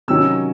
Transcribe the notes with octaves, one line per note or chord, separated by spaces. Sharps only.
C3 D#3 F#3 C#4 E6